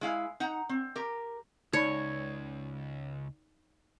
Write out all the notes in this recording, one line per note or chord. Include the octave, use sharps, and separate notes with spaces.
G#3 E4 F5 G#5
D#4 F#5 A#5
C4
G4 A#4
C#2 D#4 C#5 D5 B5